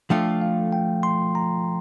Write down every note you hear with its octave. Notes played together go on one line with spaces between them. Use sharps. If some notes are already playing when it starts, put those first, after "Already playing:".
F3 A3 D4 F4 A4 G5
F5
G5
C6
A#5